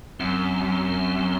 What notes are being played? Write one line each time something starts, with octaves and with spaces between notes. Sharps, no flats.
F#2 C4